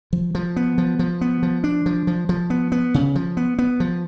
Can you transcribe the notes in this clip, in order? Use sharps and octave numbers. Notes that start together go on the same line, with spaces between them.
F3
F3
B3
F3
F3
B3
F3
D4
F3
F3
F3
B3
B3
C#3
F3
B3
B3
F3